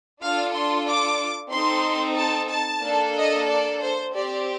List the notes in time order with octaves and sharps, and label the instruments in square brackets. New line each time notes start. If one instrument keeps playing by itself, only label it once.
[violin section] D4 F4 A4 F5
C6
D6
C4 D#4 A4 C6
A5
A5
A#3 D4 A4
D#5
D5
C5
C4 G4 D5